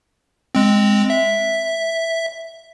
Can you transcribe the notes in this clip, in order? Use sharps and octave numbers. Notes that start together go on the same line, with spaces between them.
G#3 C4
E5